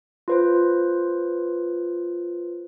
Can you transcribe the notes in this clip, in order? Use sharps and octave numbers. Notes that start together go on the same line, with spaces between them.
F4 B4 C5